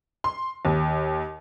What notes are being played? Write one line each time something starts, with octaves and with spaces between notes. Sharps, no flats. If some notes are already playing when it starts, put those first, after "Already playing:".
C6
D#2